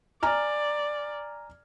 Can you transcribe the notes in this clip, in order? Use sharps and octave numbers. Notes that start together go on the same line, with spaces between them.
D5 G#5 A#5 F6